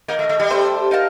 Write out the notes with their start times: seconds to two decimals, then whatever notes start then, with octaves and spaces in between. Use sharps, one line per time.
0.08 A#3 D#4 A#4 D#5
0.19 A3
0.29 A3
0.40 G3
0.50 A3 D4 A4 C5
0.91 D#4 A#4 F5 A5